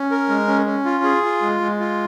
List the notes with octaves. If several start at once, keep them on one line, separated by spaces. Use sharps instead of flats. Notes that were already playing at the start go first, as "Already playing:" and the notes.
Already playing: C#4
A#4
G#3
C#4
C#4
F4
G#4
F4
G#3
G#3
F4